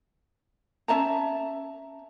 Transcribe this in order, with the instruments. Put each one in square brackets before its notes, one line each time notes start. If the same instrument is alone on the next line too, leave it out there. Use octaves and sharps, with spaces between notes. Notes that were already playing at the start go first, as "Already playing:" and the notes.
[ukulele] C#4 E5 A5 A#5